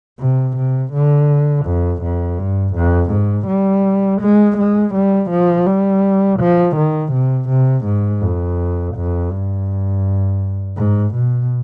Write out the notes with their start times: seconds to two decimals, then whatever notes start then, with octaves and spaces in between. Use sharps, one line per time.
0.20 C3
0.57 C3
0.93 D3
1.66 F2
2.03 F2
2.39 G2
2.75 F2
3.12 G#2
3.48 G3
4.21 G#3
4.58 G#3
4.94 G3
5.31 F3
5.67 G3
6.40 F3
6.76 D#3
7.13 C3
7.49 C3
7.86 G#2
8.22 F2
8.96 F2
9.31 G2
10.77 G#2
11.14 B2